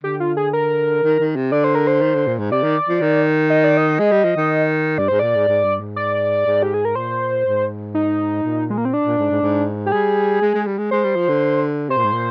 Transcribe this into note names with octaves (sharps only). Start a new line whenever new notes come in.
D3 G4
F4
G#4
A#4
D#3
D#3
C3
D3 D5
C5
A#4
C5
D#3
D3
A#2
G#2
C3 D5
D#3
F3
D#3
D#5
D5
D#5
G#3
G3
F3
D#3
G2 D5
G#2 C5
A#2 D5
G#2
G#2
G2
G#2
D5
G#2
G4
G#4
A#4
A#2 C5
G#2
D#4
A#2
G#3
A#3
C4
D4
A#2
G#2
G#2
G#2
G4
G3 G#4
G#3
G#3
G3
G#3
G#3 C5
G3
F3
D3
C3 C5
A#2
G#2
A#2